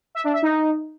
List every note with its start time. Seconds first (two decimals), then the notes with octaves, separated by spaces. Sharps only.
0.15 E5
0.24 D4
0.33 E5
0.42 D#4